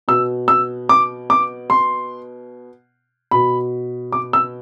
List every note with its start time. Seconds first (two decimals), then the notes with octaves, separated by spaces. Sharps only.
0.08 B2 E6
0.48 E6
0.89 D6
1.30 D6
1.70 C6
3.31 B2 B5
4.12 D6
4.33 E6